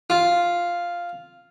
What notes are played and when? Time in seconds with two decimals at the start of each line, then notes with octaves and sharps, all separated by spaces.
0.10 F4